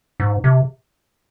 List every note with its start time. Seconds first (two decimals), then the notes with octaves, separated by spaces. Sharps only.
0.20 G#2
0.44 C3